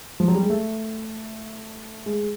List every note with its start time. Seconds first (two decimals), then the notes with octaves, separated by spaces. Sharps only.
0.20 F3
0.28 F#3
0.35 G3
0.43 G#3
0.50 A3
2.06 G#3